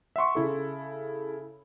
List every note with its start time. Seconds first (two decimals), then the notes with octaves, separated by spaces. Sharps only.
0.16 E5 F#5 C6 C#6
0.35 C#3 E4 A4